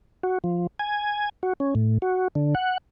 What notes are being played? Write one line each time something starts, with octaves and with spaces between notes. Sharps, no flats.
F#4
F3
G#5
F#4
C#4
A2
F#4
D3
F#5